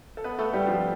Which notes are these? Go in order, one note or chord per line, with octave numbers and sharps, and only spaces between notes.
A4
B3 B4
A3 A4
G3 G4
F3 F4